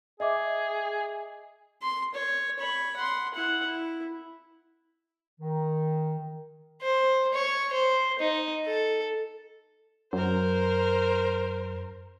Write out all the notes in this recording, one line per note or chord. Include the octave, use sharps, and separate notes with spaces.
G#4 D#5 E5 D6
C6
C#5
C#5 B5
F#5 C6
E4 F#5
E4
D#3
C5
C#5
C5
D#4
A4
F#2 A#4 C5